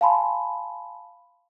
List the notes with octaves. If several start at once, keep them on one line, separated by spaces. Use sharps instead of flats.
F5 G#5 A5 B5 C6